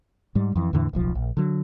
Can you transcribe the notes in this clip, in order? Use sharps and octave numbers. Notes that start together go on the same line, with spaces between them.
G#2 G3
F2 E3
E2 A2 D3 E3
D1 B1 F3
A#1
D3 F#3